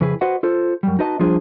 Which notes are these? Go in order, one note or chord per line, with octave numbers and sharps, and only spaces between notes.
F2 C#3 E4 G#4 B4
F#4 B4 C5 D#5 F#5
F4 A4 C5
F#2 G3
D#4 F#4 B4 D#5 A5
F3 G3 D4 F4 G#4 C5